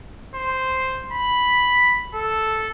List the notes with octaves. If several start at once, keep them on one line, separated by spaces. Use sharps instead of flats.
C5
B5
A4